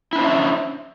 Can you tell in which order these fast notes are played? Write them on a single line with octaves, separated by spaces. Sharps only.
E4 D4 C5 C#4 E5